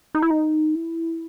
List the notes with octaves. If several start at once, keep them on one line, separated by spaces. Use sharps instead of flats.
D#4
E4
D#4
E4